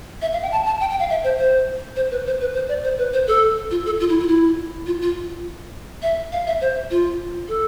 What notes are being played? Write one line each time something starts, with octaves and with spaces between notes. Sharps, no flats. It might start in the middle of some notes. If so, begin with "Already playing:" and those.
E5
F5
G5
A5
A5
G5
G5
F5
E5
C5
C5
C5
B4
C5
B4
C5
D5
C5
B4
C5
A4
F4
A4
F4
E4
F4
E4
F4
F4
E5
F5
E5
C5
F4
A4